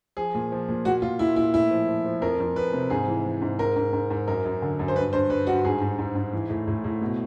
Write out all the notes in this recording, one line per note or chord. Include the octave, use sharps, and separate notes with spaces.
F3 G#4
A#2
F3
A#2
A#2 F#4
A#2 F4
A#2 E4
A#2 E4
A2 E4
F3
F3
F3
F2 A#4
F2
F2 B4
C3
G#2 G#4
E3
E3
G#2
G#2 A#4
G#2
G#2
G#2
F#2 A#4
F#2
D3
F#2
C5
G2 B4
G2 C5
G2 B4
G2 F#4
G#2 G#4
G#2
G#2
G#2
E3
A2
A2
A2
B2